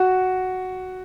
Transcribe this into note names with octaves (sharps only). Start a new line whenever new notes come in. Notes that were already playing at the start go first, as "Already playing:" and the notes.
Already playing: F#4